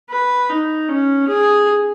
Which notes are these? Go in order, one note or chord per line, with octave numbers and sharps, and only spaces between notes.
B4
D#4
C#4
G#4